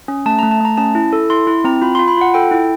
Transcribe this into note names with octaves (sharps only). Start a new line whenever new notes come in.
C#4
A3 A5
A3 A#5
A5
A3 A#5
C#4 A5
E4
A4
E4 C6
E4
C4 A#5
F4 B5
C6
F4
B5
F4 F#5
A4 G5
E4